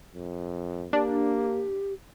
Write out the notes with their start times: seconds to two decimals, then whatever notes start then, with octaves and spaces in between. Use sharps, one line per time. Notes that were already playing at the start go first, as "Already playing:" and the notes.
0.14 F2
0.93 A#3 D4 G4